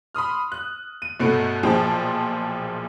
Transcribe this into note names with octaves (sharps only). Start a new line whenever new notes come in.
B5 C6 D#6 F6
F#6
D#7
G1 B2 A3 B3 D7
B1 A#2 F3 G#4 G5 A5